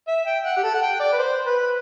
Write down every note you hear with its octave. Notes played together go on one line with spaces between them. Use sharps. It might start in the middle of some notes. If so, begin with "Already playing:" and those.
E5
G5
F#5
G4
A4
F#5
G5
D5
B4
C5
B4